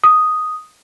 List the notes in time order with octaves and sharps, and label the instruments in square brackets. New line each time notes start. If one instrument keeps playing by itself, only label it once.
[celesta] D#6